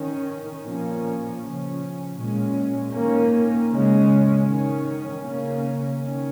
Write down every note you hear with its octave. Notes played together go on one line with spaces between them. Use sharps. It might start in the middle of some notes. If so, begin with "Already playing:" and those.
Already playing: D#3 C#4
A#2 F3 A#3 C#4
C#3 F3 C#4
A#2 G#3 C#4
D#3 A#3 C#4
C#3 G#3 C#4
D#3 C#4
C#3 A#3 C#4
D#3 C#4